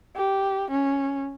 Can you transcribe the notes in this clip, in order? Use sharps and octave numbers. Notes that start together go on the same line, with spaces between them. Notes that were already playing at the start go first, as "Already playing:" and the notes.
G4
C#4